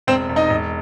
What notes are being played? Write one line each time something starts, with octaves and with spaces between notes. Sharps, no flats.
E1 C4 C5
E1
D#4 D#5
E1